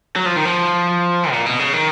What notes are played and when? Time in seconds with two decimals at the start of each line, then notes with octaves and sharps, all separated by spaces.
0.16 F#3
0.26 F3
0.36 D#3
0.45 F3
1.32 A#2
1.46 B2
1.59 C#3
1.73 D#3